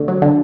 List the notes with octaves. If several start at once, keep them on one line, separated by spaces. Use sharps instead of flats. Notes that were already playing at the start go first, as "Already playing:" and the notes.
Already playing: D3 A3
F#3
D3